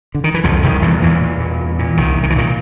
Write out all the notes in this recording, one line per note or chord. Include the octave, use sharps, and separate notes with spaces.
D3
D#3
E3
C2 F2 F3
C2 D#3
E2 A#2 E3
E2 A#2 E3
A#2
A#2
A#2
A#2
C2 D#3
C2
D#3
E3
A#2 D#3